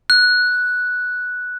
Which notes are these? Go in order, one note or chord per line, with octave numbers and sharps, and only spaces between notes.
F#6